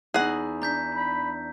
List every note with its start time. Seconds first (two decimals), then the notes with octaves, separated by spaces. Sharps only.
0.14 E2 D#4 G#4 F#5
0.62 D4 A#5 G6 B6
0.95 B5